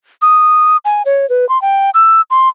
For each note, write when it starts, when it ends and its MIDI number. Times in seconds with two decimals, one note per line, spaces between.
0.22 0.77 87
0.85 1.03 80
1.06 1.28 73
1.30 1.48 71
1.49 1.60 84
1.62 1.90 79
1.94 2.22 88
2.31 2.49 84